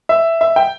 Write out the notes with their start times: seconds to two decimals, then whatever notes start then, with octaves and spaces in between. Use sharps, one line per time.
0.09 E5
0.41 E5
0.56 G5